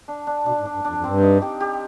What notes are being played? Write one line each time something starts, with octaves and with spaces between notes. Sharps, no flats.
D4
D4
B2 D4
G#2
D4
G2
F2 D4
F2
G2 C4
D#4
G4
G4